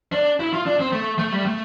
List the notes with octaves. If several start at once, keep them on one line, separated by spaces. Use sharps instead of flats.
D4
E4
F4
D4
C4
A3
A3
G3
A3